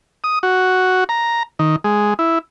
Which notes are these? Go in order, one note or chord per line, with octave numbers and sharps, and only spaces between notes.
D#6
F#4
A#5
D#3
G#3
E4